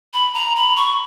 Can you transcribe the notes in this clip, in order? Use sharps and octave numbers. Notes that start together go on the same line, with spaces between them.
B5
A#5
B5
C#6